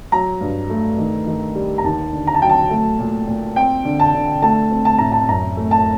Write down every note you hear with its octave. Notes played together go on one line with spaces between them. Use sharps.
F#3 A#5
G2
A3
D#3
D#3
G3
A#5
D#2 A5
D3
A#5
A5
F#3 G5
A5
A3
A#2
A#2
C4 G5
D3
A5
D3
A3 A5
C4
A5
A2 A#5
A5
F#2 A#5
A3
A5